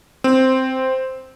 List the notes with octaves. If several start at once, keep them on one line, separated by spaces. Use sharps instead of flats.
C4